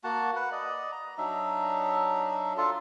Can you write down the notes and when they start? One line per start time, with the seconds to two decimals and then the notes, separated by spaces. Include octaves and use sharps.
0.04 A#3 F#4 F#5 A5
0.35 B4 F#5
0.52 D5 D#5
0.92 A#5
1.18 F#3 D4 D#4 E5
2.57 D4 F4 A4